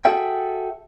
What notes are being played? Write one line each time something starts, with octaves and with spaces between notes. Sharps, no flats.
F#4 G#4 A4 E5 G5